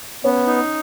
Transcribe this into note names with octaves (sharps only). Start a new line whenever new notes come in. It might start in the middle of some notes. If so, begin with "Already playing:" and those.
B3 C#4
D#4